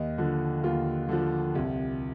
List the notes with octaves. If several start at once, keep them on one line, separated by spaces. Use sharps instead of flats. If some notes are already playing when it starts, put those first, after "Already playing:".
Already playing: D#2 D#5
D3 F3
D#2 F4
D3 F3
C2